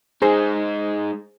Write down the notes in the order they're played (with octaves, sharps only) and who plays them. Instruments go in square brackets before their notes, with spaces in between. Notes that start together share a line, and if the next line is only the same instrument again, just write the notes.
[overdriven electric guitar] G#3 D#4 [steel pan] G#4 C5 C6